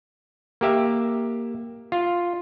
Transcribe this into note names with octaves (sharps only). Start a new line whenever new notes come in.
A#3 G4 E5
F4